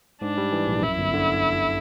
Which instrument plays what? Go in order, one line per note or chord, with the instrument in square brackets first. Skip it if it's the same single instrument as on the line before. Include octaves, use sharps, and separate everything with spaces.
[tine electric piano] G#2 [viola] D4
[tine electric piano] G3
E3
A#1
[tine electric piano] F#2 [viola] E4
[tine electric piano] G1
D3